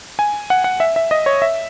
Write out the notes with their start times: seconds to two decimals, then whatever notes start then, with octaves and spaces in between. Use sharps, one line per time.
0.19 G#5
0.50 F#5
0.64 F#5
0.80 E5
0.96 E5
1.11 D#5
1.26 C#5
1.42 E5